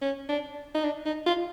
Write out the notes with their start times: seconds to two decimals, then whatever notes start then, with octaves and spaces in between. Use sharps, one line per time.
0.02 C#4
0.29 D4
0.75 D#4
0.84 D4
1.06 D#4
1.26 F4